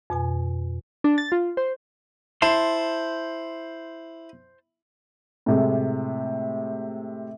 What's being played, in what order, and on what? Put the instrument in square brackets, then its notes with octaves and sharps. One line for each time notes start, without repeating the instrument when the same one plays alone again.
[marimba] F2 B2 G#5
[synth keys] D4
A6
F4
C5
[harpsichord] E4 [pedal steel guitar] C5 A5 C6
[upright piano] A2 C3 G#3